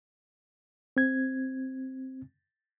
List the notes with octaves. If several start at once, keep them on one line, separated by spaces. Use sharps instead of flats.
C4 G#6